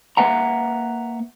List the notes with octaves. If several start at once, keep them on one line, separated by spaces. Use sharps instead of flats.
A#3 B4 E5 F#5 A#5